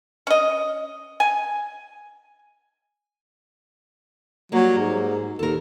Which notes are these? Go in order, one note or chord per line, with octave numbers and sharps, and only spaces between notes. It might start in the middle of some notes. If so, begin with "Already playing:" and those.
C#4 D#5
G#5
F#3 G3 A#3
G#2
D#2 A4 A#4